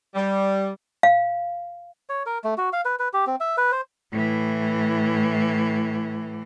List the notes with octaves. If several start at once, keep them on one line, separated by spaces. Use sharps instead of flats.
G3
F5
C#5
A#4
A3
F#4
F5
B4
B4
G4
C4
E5
B4
C5
A2 E3